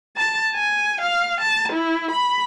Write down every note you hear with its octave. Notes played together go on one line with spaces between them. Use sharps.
A5
G#5
F5
A5
E4
B5